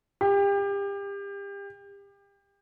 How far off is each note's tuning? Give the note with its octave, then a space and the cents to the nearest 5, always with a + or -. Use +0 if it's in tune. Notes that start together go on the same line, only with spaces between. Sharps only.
G4 +30